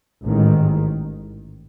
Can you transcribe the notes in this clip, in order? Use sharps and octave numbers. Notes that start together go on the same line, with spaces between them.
A1 G#2 D#3